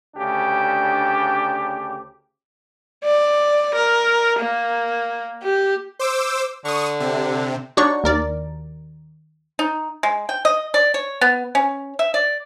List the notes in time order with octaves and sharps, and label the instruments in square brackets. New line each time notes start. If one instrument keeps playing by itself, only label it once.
[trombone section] D2 C#3 D4 G4
[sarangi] D5
A#4
A#3
G4
[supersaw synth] C5 D6 E6
[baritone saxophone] D3 [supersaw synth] C#6 D#6
[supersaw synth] C3
[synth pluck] D4 D#4 F#4 C#5 D5 C#6
D#2 A#4 D5
[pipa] D#4
G#3
G5
D#5
D5
C#5
B3
C#4
E5
D5